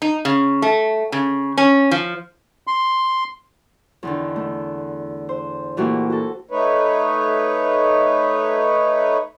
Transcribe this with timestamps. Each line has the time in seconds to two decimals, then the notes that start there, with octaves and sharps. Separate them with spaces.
0.02 D#4
0.25 C#3
0.62 A3
1.12 C#3
1.58 C#4
1.91 F3
2.67 C6
4.03 E2 D3 D#3
4.36 A3
5.29 C5
5.77 A#2 E3 A3 A#3 F#4 G4
6.10 F#4 A4
6.51 A3 D#4 B4 C#5